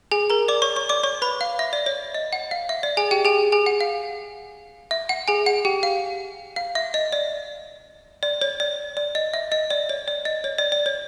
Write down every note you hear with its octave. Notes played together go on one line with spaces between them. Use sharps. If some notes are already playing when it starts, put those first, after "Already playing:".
G#4 G#5
A#4 A#5
D5 D6
C#5 C#6
C#5 C#6
D5 D6
C#5 C#6
B4 B5
F5
E5
D5
C#5
D#5
F#5
F5
E5
D5
G#4 G#5
G4 G5
G#4 G#5
G#4 G#5
F#5
F5
E5
F#5
G#4 G#5
F#5
G4 G5
F5
F5
E5
D#5
D5
D5
C#5
D5
D5
D#5
E5
D#5
D5
C#5
D5
D#5
C#5
D5
D5
C#5